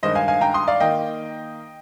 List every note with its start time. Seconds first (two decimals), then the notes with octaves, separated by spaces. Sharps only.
0.03 G2 D#3 G#3 C5 D#5
0.15 F5 G#5
0.28 F5 G#5
0.41 G5 A#5
0.54 C6 D#6
0.68 D5 F5
0.80 D#3 A#3 D#5 G5